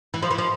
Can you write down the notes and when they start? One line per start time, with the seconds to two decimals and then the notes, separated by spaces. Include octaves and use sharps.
0.14 E3
0.22 F3
0.31 E3
0.38 F3